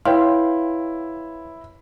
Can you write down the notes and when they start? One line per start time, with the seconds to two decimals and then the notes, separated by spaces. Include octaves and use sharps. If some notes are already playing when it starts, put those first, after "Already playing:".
0.05 E4 B4 C#5 F5 G5 C6